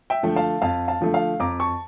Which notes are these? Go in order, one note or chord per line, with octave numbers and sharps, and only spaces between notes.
E5 G5
D3 F3 A3
F5 A5
F2 F5 A5
F5 A5
D3 F3 A3
F5
F2 A#5 D6
A5 C#6